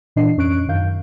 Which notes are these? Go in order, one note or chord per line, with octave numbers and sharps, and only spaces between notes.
A#2 E3 D4 D#5 C7
F2 C#4 C#6 F#6 D7
F#2 D#3 F5 G6